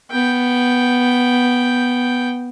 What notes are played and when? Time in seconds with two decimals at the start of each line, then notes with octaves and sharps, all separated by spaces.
0.11 B3 G5